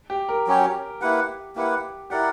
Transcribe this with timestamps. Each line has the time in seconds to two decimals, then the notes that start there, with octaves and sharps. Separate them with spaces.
0.10 G4
0.29 A#4
0.47 F#3 C#4 G4 C#5
1.01 A#3 E4 G4 B4 F#5
1.56 A#3 E4 G4 B4 F#5
2.10 E4 G4 A#4 D5 F#5